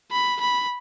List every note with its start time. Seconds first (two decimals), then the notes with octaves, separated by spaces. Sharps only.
0.12 B5
0.40 B5